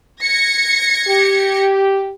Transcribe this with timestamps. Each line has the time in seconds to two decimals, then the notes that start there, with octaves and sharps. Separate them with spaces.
0.22 G#6 A#6 C#7
1.07 G4